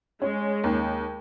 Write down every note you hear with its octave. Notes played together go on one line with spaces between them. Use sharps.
G#3 C#4
D#2